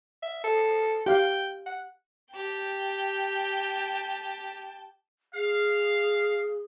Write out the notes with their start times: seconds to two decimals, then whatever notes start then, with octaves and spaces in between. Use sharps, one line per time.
0.23 E5
0.44 A4
1.06 G4 F5 G5
1.66 F#5
2.35 G4 G5 A5
5.35 G#4 F5